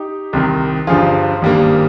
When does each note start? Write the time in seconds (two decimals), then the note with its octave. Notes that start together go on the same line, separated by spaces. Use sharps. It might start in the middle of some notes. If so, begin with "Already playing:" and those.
Already playing: D#4 G4
0.33 C2 C3 D#3
0.87 G1 G2 F3 F4 G#4
1.42 G#1 G2 G3 A#3